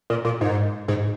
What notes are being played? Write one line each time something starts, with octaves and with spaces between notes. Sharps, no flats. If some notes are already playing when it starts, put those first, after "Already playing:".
A#2
A#2
G#2
G#2